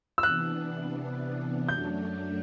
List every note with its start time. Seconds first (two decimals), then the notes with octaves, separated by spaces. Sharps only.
0.18 E6
0.23 C3 E3 B3 D4 F#6
1.69 F#2 F#3 A3 D4 G6